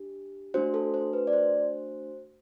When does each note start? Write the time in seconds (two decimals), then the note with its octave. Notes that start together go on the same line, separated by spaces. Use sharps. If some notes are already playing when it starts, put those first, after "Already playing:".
Already playing: D4 G4
0.54 A3 D4 F#4 C5
0.74 A4
0.94 C5
1.13 B4
1.27 D5
1.33 C5